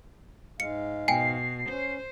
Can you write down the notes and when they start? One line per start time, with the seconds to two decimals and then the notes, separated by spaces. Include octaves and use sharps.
0.60 G#2 G#3 F5 C#7
1.08 B2 G5 G#5 C7
1.69 C#4 C5